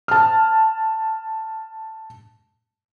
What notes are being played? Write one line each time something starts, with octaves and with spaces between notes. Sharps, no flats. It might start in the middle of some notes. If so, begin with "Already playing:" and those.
A5 F6